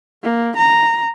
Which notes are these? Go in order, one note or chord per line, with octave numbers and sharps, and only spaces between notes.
A#3
A#5